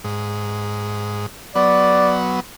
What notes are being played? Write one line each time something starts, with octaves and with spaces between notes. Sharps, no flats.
G#2
F#3 B3 D5